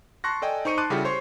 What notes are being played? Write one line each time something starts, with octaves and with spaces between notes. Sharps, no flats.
A5 C6 C#6 F#6 A#6
A4 D5 D#5 G5 G#5
D#4 C5 C#6 C#7 D#7
A5 C6 D6 F#6 D#7
C#3 G3 E4 F#4 G4 A4
C5 C#5 C6 C#6